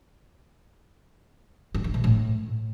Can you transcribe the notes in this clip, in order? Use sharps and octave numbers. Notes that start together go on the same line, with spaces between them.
G2
D#3
B2
A2